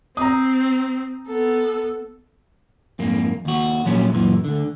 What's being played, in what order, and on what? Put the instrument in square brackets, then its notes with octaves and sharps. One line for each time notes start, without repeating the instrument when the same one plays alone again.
[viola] C4 [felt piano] A#5 D#6
[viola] B3 A4
[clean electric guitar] F2 G#2 A#3
D#2 F#4
A#2 F3 F#3 C#4
F#2 A#2 E3
D2 D3